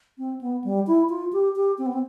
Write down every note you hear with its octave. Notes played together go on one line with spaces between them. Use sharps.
C4
B3
G3
E4
F4
G4
G4
C4
B3
C4